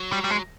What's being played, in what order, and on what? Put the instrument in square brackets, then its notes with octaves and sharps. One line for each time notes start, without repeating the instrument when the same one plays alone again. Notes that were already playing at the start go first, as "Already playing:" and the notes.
Already playing: [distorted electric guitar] F#3
[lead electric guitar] G3
G3
G#3